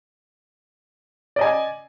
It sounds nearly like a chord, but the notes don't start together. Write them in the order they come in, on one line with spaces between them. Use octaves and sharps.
D5 D#5 G#5